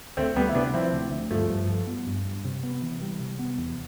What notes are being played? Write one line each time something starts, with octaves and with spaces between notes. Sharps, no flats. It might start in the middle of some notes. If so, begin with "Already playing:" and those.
D2 A3 C4
D2 G3 B3
E4
C3 B3 D4
F3 C4 E4
D2
D2
G2 F3 A3
G2
F3
B3
G2
G2
C3
B3
E3
G3
C3
B3
E2